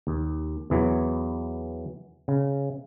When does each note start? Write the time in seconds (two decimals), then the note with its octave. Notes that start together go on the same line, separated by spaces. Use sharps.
0.07 D#2
0.70 E2 E3 F#3
2.28 C#3